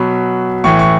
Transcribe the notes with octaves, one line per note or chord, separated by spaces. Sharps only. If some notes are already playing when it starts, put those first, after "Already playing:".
Already playing: B2 F#3 B5
A2 E3 C#6
C#6